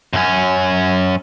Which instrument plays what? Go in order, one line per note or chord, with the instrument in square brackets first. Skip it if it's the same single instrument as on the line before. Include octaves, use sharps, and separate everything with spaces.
[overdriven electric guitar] F#2 C#4